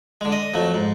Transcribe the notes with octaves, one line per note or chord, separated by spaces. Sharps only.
D3 G#3
D#5
F2 F#3 A3
G#2